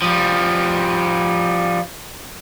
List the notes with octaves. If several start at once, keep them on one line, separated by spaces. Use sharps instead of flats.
F3 G3